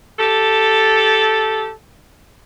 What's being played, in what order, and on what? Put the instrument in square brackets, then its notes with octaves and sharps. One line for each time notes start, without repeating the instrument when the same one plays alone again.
[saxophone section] G4 A4